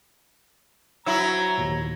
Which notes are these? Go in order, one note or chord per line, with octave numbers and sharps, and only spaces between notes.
F#3 E4 C5 C#5 A#5 E6
D#2 A#2